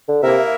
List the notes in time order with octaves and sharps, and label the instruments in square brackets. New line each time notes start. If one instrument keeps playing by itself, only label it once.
[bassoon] D3
[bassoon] C3 [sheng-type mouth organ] A#3 E4 A#4 E5